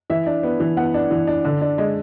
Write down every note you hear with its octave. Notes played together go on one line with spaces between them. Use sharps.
E3 E5
D4
B3
E3
B3 F#5
D4
E3
D4
D3
D4
G#3